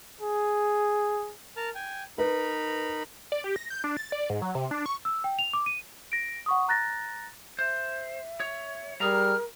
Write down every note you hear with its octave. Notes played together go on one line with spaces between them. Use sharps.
G#4
A#4 A5 F6
G5 G#5
D#4 A#4 B4 B5
D5
G4
A#6
G6
D4
A6
D5
G#2
F#3
C3
D4
C#6
E6
G5
F7
D6
D#7
A#6 D7
F#5 C#6 D#6
A#5 F#6 A6 A#6
C5 E5
C#5
G3 G#4 A#4 A#5 F6